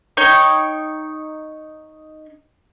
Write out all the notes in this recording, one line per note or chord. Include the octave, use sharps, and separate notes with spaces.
D#4 C#5 G5 C#6